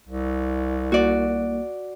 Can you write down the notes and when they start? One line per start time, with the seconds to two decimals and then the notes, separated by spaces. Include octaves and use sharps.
0.08 C2
0.92 A#3 F#4 D5